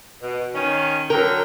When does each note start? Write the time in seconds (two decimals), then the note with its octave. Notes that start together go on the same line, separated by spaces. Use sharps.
0.23 B2
0.55 D#3 C#4
1.10 D3 F#3 A#4 G5